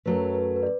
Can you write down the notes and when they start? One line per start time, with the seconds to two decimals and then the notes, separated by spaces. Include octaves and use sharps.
0.06 F#2 F#3 A3 B4
0.34 B4
0.56 B4
0.63 D5